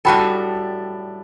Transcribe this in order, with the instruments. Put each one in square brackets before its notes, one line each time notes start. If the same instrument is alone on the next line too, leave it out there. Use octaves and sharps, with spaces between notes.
[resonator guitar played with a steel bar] A2 G3 D4 F#4 A4 [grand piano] G5 B5